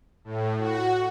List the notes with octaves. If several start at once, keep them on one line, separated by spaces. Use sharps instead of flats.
A2
F#4